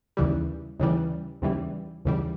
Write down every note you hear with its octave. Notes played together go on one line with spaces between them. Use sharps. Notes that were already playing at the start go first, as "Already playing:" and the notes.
D#2 C#3 E3 G3
D#2 C#3 E3 G3
D#2 C#3 E3 G3
D#2 C#3 E3 G3